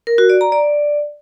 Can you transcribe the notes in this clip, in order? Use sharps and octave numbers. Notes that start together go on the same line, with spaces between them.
A#4
F#4
D5
A#5
D5